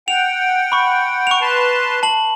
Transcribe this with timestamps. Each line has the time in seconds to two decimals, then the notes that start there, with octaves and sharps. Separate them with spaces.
0.08 F#5 G5 F7
0.72 B5 C#6
1.27 C#6 F7
1.41 B4 A5 C6
2.03 A5 F#7